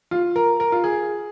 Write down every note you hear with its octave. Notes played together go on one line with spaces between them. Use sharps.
F4
A#4
A#4
F4
G#4